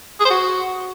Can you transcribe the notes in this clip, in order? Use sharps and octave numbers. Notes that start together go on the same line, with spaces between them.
G#4
C5
F#4